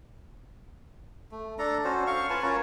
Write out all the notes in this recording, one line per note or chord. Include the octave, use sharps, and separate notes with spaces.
A3
D4 A4 A#5
C#4 F#4 C5
F5 C#6
F4 B4 G#5 A5
C#4 A#4 C#5